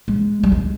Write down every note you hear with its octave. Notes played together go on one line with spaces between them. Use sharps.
G#3
G3
G#3